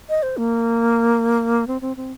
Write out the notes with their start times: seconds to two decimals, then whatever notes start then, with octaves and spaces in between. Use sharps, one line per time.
0.09 D#5
0.23 C5
0.37 A#3
1.67 C4
1.81 C4
1.97 C4